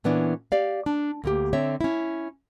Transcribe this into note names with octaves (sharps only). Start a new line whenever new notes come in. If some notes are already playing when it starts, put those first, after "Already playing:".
A#2 E3 B3 C#4 D4 E4
G4 D5 F5
D4
D2 A#3 G4
D3 C4 C#5 E5
C#4 E4